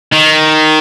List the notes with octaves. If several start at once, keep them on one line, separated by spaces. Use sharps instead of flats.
D#3